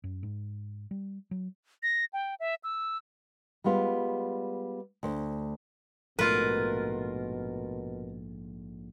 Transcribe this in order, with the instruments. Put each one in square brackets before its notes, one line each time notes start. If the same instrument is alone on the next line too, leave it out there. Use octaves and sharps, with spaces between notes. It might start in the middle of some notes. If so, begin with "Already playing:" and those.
[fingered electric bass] F#2
G#2
G3
F#3
[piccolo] A#6
G5
E5
E6
[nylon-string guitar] G3 G#3 B3 F4
D2 C5
[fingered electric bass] A#1 G#2 A3 [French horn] B2 [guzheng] F4 B4 [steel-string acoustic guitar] A#4